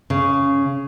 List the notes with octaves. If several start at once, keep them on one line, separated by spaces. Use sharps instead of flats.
C#3